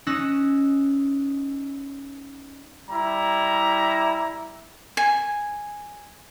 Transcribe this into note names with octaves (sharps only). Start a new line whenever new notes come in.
C#4 D#4 E6 F#6 A#6
G3 E4 A#5
G#5